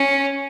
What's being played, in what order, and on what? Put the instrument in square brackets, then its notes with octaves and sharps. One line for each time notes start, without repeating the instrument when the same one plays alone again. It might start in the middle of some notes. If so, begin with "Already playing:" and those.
Already playing: [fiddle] C#4